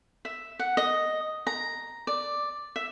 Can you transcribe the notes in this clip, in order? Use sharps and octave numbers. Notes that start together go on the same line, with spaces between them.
E5
F#5
D#5
A#5
D5
E5